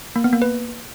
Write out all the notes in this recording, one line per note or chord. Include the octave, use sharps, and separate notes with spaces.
A#3
B3
A#3
B4